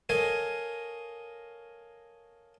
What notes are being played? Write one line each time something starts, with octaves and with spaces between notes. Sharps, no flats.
A4 A#4 C#5 D#5 F5 G#5